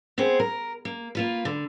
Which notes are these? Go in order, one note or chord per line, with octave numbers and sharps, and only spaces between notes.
B3 C4 G#4 C5
A#4
A#3
A#3 F4 B4
D3